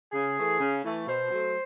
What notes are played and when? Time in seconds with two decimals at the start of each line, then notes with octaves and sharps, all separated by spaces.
0.13 C#3 G#4
0.37 E3 A3
0.60 C#3
0.85 E3 A3
1.07 B2 C5
1.31 F#3 A3